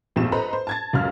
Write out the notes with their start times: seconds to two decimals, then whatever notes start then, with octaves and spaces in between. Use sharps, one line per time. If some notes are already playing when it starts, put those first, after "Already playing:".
0.16 A#1 F2 G#2 B2 G4 E7
0.32 A4 B4 C5 D#5 A#5 B5
0.53 C5
0.67 A5 G#6 A6
0.93 C#2 F#2 F6